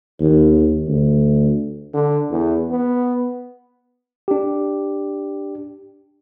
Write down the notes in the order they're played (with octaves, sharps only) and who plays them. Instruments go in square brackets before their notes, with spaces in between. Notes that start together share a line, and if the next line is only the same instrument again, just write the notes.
[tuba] D#2
D2
[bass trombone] D3
E2
B3
[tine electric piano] D4 G4